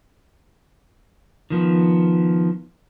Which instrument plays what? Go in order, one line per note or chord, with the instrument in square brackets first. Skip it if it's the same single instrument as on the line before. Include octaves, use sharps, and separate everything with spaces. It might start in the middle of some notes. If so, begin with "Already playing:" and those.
[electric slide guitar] D#3 F3 B3